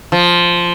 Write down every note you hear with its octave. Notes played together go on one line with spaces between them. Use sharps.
F3